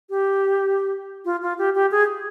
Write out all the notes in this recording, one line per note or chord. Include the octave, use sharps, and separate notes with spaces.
G4
F4
F4
G4
G4
G#4